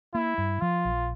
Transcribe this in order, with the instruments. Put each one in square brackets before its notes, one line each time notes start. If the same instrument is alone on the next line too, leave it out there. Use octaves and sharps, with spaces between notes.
[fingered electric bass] A#3 [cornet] E4
[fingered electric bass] G2
[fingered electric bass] F3 [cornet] F4
[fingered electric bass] A#1